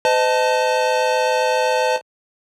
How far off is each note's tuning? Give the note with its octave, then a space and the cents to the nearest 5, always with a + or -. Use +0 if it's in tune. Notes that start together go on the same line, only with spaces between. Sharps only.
C5 -45 D#5 +0 A5 +5